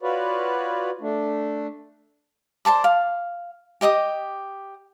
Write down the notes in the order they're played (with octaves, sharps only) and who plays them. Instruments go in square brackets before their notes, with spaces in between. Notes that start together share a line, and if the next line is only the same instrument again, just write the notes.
[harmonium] F4 F#4 B4 C#5 D5
A3 D4
[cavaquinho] C5 D5 A5 D6
F5
G4 D#5 D6 D#6